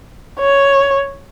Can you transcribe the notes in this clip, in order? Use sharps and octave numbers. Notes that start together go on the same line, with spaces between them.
C#5